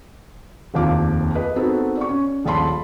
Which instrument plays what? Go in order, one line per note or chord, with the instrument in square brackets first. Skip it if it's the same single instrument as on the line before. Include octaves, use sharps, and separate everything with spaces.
[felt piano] F1 A#1 D#2 F3 F5 D6
G#4 B4 D#5
B3 C4 D#4 F#4 G#4 A4
D5 C#6
C#4
D#1 A#1 A5 B5 C6